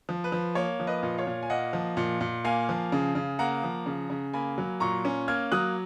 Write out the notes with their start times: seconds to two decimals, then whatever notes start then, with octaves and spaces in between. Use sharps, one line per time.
0.09 F3
0.24 B4
0.32 F3
0.55 A#3 C#5
0.80 F3
0.87 B4 D#5
1.03 A#2
1.18 C#5 F5
1.27 A#2
1.43 G#5
1.50 A#3 D#5 F#5
1.73 F3
1.97 A#2
2.21 A#2
2.44 A#3 F5 G#5
2.69 F3
2.92 C#3
3.15 C#3
3.39 A#3 F#5 A#5
3.63 F3
3.86 C#3
4.10 C#3
4.34 A#3 G#5 B5
4.58 F#3
4.80 A#2 A#5 C#6
5.05 C#4
5.28 A#3 F6 G#6
5.52 F#3 D#6 F#6